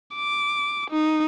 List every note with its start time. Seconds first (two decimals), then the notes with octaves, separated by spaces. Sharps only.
0.16 D6
0.90 D#4